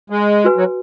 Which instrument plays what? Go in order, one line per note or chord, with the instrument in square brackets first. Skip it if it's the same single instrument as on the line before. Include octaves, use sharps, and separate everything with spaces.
[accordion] G#3
[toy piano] F#4 B4 G#5
[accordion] F#3